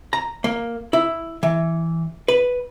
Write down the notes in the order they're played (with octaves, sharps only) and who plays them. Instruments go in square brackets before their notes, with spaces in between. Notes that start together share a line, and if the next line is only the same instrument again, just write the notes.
[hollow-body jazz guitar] A#5
A#3
E4
E3
B4